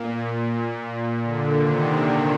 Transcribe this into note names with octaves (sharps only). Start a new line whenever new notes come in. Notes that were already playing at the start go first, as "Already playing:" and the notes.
Already playing: A#2
D3
C3 D#3